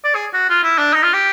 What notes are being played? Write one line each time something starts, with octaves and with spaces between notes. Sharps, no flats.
D5
G#4
F#4
F4
E4
D4
D#4
F4
G4